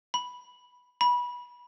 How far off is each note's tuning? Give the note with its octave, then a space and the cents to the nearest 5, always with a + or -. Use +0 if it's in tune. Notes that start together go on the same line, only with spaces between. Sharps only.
B5 -5
B5 -20